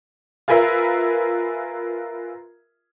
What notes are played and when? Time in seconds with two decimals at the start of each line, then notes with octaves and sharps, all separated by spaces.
0.48 F4 G#4 A#4 B4 E5